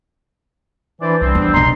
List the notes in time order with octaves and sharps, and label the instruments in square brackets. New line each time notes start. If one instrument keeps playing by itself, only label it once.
[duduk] E3 [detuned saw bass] D4 [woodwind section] E4 C5 D5
[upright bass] C2 [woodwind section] F3 C4 [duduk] G3
[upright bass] E2
[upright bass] B1 F4 [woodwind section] D#5 A#5 C6